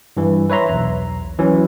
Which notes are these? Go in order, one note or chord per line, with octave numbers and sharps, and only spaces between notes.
G2 E3
B4 C#5 E5 A#5 C6
B1 E2
E3 F#3 C#4